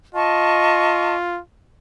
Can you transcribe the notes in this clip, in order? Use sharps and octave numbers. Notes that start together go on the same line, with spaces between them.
F4 D#5 A5 C#6